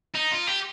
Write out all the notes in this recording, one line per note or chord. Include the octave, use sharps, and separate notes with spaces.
D#4
F4
G4